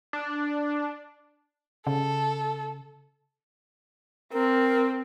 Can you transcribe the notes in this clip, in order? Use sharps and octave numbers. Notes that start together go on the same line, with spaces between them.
D4
C#3 A4
C4 A#4